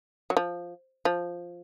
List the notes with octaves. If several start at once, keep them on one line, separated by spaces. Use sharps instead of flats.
F#3
F3
F3